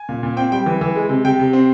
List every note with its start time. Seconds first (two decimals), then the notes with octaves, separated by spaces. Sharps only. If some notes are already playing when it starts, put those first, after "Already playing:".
Already playing: G#5
0.09 A#2
0.23 A#2
0.37 C4 G5
0.52 G3 G5
0.66 E3
0.81 E3
0.96 G#3
1.09 C3
1.25 C3 G5
1.39 C3
1.53 C4